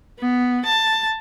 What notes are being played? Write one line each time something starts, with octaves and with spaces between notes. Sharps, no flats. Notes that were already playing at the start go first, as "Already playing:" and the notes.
B3
A5